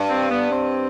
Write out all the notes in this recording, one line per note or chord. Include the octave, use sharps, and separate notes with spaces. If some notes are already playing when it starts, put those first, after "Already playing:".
Already playing: G2
C4
B3
C4